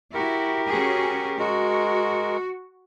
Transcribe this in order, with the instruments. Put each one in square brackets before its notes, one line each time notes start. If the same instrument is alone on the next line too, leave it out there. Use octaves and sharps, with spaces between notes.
[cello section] E4 F#4 [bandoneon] G4 A#4
[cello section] C#4 F#4 G#4
[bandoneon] G#3 A#4 [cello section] F#4